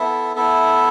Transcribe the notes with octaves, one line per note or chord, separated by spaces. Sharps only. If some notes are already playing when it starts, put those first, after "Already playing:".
Already playing: B3 E4 A4 E5
B3 E4 A4 E5